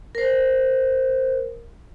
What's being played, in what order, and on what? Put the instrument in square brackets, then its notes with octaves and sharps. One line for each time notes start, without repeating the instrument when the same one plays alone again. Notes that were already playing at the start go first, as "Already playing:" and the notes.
[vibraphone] A#4 C5